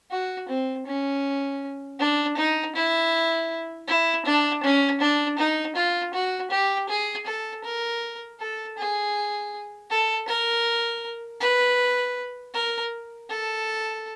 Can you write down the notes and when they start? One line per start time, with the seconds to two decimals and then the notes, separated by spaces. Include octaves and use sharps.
0.11 F#4
0.49 C4
0.86 C#4
1.99 D4
2.37 D#4
2.75 E4
3.88 E4
4.26 D4
4.63 C#4
5.01 D4
5.38 D#4
5.76 F4
6.14 F#4
6.51 G4
6.89 G#4
7.26 A4
7.64 A#4
8.40 A4
8.77 G#4
9.90 A4
10.28 A#4
11.40 B4
12.54 A#4
13.29 A4